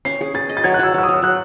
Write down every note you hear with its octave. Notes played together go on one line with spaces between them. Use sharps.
C#4 C7
G#4
G#4 A6
D#5
A6
F#3 G#6
F#6
F#3 E6
F#3 E6
D#6
F#3
E6
F#3 F#6